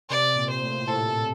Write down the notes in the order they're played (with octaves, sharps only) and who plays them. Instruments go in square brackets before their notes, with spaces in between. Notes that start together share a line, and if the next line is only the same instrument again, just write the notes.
[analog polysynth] C3 [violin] D5
[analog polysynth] A#2
[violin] C5
[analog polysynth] A2
[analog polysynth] A2 [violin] A4
[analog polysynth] A2